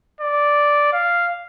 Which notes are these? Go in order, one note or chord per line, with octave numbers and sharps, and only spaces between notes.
D5
F5